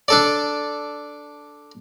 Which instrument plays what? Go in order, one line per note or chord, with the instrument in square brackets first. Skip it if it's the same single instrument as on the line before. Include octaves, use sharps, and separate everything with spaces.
[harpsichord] D4 A4 D5